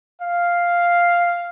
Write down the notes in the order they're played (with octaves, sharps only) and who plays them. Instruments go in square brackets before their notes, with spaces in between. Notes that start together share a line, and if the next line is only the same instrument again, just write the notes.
[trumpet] F5